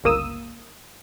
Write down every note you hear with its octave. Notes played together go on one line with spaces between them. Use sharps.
G1 C#2 A#3 D#6 E6